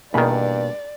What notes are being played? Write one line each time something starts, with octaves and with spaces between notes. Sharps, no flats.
E2 G2 B2 D#3 A#3 D5 B5